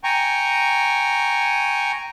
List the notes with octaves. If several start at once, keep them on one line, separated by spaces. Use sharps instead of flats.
G5 G#5 A#5 C#6